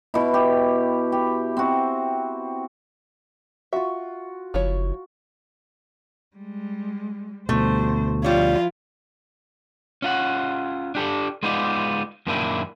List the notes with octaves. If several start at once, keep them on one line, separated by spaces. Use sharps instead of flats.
B2 E4
G4
G4
C4 F#4
F4 F#4 E5
F#1 F3 E4 C#5
G3 G#3
D2 B2 G3 A3 C5
F3 G3 E4 F4 C#5
C#4 F4 F#5
D4 G4 A4 D5
G#3 B3 D#4 F4 D5
F#2 A#2 D#3 A#3 D4 E4